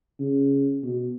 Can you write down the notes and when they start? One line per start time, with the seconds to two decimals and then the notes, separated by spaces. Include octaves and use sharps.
0.19 C#3
0.83 B2